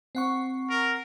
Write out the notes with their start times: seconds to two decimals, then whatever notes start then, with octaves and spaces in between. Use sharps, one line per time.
0.15 C4 F#5 C#6
0.70 A#4